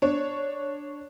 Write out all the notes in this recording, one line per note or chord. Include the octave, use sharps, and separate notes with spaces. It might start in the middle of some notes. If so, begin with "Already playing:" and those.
D4 C#5